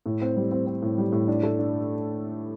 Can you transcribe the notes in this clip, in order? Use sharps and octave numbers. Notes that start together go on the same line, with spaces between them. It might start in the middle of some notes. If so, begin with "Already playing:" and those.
A2
C4
G3
C4
C4
A2
G3
A2
D4
A3
D4